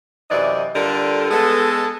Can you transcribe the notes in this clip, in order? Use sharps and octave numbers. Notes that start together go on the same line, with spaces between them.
F#2 C3 E3 D5 D#5
D3 G3 F4 A4 A#4
G#3 B3 A4